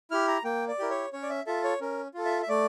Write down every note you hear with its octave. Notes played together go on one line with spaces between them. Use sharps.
E4 G4 F6
A#5
A#3 G5
D5
E4 G4 A#4
C#5
C#4 C#5
D5
E5
F4 A4 E5
C#5
C#4 A#4
F4 A4
E5
E5
A3 D5